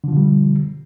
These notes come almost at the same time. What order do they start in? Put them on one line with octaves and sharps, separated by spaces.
D3 F3 B2 G3